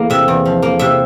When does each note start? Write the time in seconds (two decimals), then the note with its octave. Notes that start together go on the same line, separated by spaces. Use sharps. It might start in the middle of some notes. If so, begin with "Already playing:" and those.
Already playing: E2 A#3
0.10 C3 E5
0.28 E2
0.45 F3
0.62 A#3
0.79 C3 E5